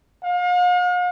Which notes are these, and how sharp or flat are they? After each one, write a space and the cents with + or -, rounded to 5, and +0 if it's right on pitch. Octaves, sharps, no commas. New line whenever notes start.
F5 +45